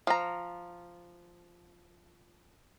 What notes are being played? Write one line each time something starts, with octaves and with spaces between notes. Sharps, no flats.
F3 A#5